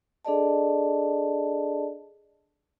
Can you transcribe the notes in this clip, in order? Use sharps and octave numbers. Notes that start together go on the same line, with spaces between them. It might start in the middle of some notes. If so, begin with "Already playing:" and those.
D4 G#4 A4 D5 D#5 A5